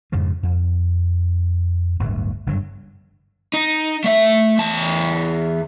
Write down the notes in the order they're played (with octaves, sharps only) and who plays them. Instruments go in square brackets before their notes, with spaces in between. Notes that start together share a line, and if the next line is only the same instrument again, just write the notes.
[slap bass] F2 G#2 C#3 F3
F2
D1 G1 D2
F#1 G2 D3 F#3
[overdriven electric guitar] D#4
A3 E5
E2 A5